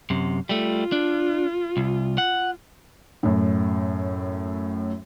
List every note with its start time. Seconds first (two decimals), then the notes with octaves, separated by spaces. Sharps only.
0.10 F#2 C3
0.49 G3 A3 F4
0.92 D4
1.77 C2
2.18 F#5
3.23 F#2 A2